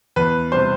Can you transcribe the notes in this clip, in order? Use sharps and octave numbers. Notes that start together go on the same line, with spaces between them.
E2 B4
C3 G3 C5